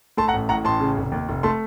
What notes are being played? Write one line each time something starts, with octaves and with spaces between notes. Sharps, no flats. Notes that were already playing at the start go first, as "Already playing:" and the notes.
A3 A5 C6
F#5 A#5
A1
A2 F#5 A#5
A1 A5 C6
C#3
F1
D#2
F1
A3 A5 C6